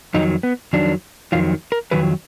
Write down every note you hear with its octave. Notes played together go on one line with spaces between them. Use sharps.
F2 D#3 F#3 D#4
B3
F2 D#3 F#3 D4
F2 D#3 F#3 F4
A#4
F2 D#3 F#3 B4